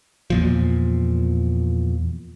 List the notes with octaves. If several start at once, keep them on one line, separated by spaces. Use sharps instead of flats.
E2 A#2 F3